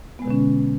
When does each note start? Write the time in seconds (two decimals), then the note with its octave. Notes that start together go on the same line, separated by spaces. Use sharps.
0.19 B3
0.22 G#3
0.25 B2
0.28 D3
0.30 C#4